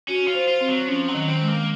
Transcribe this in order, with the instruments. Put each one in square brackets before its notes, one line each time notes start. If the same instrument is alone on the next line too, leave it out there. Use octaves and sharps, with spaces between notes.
[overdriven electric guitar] C#4 [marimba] F#4
[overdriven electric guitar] F4
[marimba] C5
[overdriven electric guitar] F4
[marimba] C4
[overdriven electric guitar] F#3
[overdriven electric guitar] F3 [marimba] C#4
[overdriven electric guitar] F#3
[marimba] D#3
[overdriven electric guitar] C4
[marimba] G#3
[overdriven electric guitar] A#3